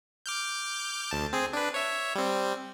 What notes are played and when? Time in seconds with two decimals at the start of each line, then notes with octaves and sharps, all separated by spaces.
0.26 D6 F6 G6
1.11 D2 A5
1.33 C4 G#4
1.53 D4 B4
1.74 C#5 E5
2.15 G3 C4